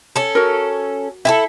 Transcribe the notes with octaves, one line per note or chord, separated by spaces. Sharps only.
C#4 A4
F#4 A#4
E4 G4 A4 E5